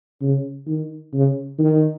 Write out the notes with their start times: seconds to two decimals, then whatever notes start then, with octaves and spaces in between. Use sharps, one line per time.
0.22 C#3
0.67 D#3
1.14 C#3
1.59 D#3